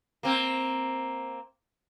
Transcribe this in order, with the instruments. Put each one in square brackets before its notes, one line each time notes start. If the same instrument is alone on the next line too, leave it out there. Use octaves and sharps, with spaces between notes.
[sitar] A#3 C4